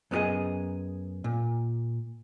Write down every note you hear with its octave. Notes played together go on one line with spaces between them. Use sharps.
F#2 B3 D#4 G4 G#4 D#5
A#2